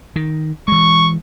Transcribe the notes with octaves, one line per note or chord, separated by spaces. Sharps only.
D#3
E3 G#3 C#6